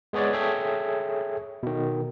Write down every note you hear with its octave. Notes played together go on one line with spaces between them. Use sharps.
G#3 B3 G#4 C#5 D5
G#4 A4 C#5 E5 G5
B2 D#3